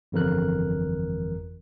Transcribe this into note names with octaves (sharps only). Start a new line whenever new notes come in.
G1 F2 E3 A#4 F#6